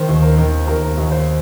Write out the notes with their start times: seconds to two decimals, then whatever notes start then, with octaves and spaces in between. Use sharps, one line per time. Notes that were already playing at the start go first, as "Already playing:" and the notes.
Already playing: D#3 C5
0.08 D#2
0.22 A#4
0.38 D#3
0.67 D#2 A#4
0.97 D#2
1.12 C5